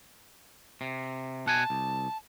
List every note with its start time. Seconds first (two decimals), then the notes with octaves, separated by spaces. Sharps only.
0.81 C3
1.46 B2 F#5 G#5 A5
1.70 C2